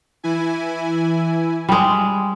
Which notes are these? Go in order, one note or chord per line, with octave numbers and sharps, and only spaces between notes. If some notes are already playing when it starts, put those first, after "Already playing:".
E3 E4 G#5
G3 G#3